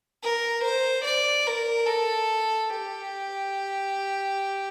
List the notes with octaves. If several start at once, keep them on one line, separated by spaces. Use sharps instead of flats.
A#4
C5
D5
A#4
A4
G4